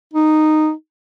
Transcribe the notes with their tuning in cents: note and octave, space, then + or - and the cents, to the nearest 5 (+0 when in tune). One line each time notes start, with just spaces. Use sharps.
D#4 -10